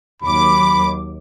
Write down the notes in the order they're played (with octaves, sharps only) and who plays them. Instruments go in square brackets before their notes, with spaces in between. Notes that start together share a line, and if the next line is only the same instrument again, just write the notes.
[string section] D#2 F#3 D6 [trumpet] B5